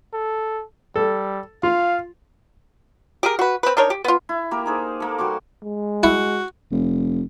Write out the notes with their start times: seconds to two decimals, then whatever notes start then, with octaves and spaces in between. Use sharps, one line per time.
0.13 A4
0.96 G3 A4
1.63 F4 F5
3.23 G4 G#4 A#4
3.39 F#4 B4
3.63 C4 B4
3.77 D4 D#4 A#4 C#5
3.90 G4
4.04 B3 F4
4.29 E4
4.51 A#3 G4 A#4
4.66 D#4 G#4 C5
5.00 A#3 A4
5.18 G3 F#4 C6 D6
5.63 G#3
6.03 E4 F#4
6.71 F1